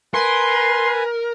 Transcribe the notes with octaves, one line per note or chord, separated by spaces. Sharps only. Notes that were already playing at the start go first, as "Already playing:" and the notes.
A#4 B4 G#5 C6